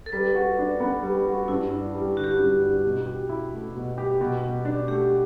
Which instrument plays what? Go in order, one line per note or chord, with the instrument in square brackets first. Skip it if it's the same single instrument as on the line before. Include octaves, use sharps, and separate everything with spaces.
[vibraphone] A4
[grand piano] G3 [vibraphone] B4
[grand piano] F#4
D4
B3
G3
F#4
[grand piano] G2 [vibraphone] E4
[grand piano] D4
G3
[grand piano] D3 [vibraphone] F#4
[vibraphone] G4
F#4
[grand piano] G2
D4
B2
G4
E4
A3
B2
G4
B2
B2
D4
[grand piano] A3 [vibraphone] G4